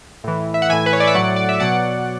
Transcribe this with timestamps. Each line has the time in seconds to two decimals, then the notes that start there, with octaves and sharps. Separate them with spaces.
0.24 A2 E3
0.54 E5
0.62 F#5
0.69 A2 E3 E5 G#5
0.86 B4
0.93 C#5
1.00 D5
1.07 E5
1.14 A2 F#3 D5 F#5
1.36 D5
1.49 E5
1.60 B2 F#3 D5 F#5